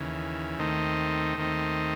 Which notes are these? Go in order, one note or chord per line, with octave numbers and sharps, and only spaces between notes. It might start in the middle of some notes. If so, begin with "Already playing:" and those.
Already playing: D#2 C#3 E3
D#2 D#3 A3 C4 D#4
D#2 D#3 A3 C4 D#4